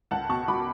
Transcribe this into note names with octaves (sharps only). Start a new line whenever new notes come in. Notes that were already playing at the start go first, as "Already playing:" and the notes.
C#2 F#5 A5
B2 A5 C#6
C#2 B5 D6